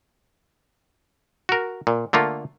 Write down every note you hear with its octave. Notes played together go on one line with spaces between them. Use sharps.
F#4 A#4
A#2
D3 A3 A#3 F4